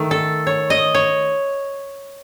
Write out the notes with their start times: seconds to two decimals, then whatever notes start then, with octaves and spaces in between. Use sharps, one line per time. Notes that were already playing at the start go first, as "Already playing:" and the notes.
Already playing: D#3 A3
0.11 A4
0.47 C#5
0.70 D#5
0.95 C#5